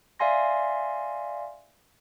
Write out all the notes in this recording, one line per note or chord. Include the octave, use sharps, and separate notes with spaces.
D5 E5 F5 G#5 C6 A#6